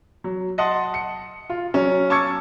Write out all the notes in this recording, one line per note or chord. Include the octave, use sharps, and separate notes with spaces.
F#3
D#5 F#5 A5 C6
C#7
F4
F#3 C#4
A5 C#6 D6 E6 G#6 C#7